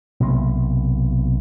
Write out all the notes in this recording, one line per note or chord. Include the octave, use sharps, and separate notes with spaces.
B1 C3 A#3